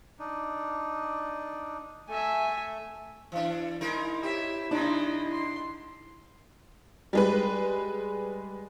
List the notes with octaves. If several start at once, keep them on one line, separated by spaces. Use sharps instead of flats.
D4 D#4
A3 A4 E5 G#5
E3 D4
G#3 D#4 E4 A#4
G4 C#5 E5
D3 G#3 D4 D#4 D5
C6
G3 G#3 B4